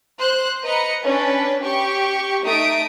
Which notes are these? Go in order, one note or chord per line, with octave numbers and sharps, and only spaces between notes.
C5 F#6
B4 D#5 A#5 C#7
C#4 D4 B4
G4 C#6
A3 D#4 E5 D#6 D7